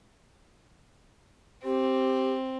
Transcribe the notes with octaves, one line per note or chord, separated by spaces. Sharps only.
C4 G4